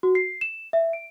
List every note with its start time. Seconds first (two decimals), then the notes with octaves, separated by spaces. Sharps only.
0.03 F#4
0.15 C7
0.41 E7
0.73 E5
0.93 D7